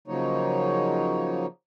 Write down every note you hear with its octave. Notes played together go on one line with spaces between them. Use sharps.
C#3 F3 F#3 A#3 D#4 C#5